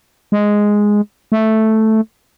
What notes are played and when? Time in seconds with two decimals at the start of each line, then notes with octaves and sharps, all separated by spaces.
0.32 G#3
1.32 A3